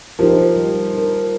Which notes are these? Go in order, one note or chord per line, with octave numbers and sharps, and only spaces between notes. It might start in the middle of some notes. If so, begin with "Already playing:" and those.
F3 D#4 G4 A#4
G3
D#4 A#4